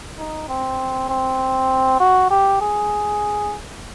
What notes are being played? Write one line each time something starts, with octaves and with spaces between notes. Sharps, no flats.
D#4
C4
C4
F#4
G4
G#4